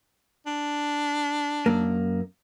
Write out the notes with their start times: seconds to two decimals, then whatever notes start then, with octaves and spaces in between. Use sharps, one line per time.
0.47 D4
1.66 F#2 A#3